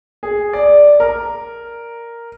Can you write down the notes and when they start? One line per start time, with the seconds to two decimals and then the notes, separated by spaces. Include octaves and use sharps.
0.23 G#4
0.53 D5
1.00 A#4